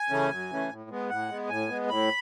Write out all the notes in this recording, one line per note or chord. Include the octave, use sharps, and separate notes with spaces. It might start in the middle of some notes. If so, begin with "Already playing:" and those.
Already playing: G#5
C#3 E3 A3 C#4
F#2
C#3 E3 A3 C#4
A2
G#3 B3
A2 F#5
G#3 B3
A2 G#5
G#3 B3
A2 B5